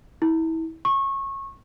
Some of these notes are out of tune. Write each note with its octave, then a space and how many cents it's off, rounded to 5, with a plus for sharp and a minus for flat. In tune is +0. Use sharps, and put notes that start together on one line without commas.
E4 -30
C#6 -20